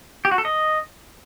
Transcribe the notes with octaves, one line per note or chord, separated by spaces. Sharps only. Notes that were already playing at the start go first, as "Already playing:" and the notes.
G4
F#4
A4
D#5